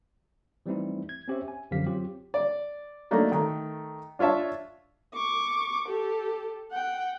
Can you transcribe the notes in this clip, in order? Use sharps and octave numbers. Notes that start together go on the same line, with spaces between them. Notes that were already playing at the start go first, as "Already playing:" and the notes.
E3 G3 A3 C4 D#4 E4
G#6
C4 C#4 G4 C5 C#5 E5
G#5
F#2 D3 F3 G4 F5 B6
F#3 C4 F4 G4
D5
F#3 A3 A#3 D4 D#4
D#3 A3
D4 F4 C#5 E5 A5
C#6 D6
G4 A4
F#5 G5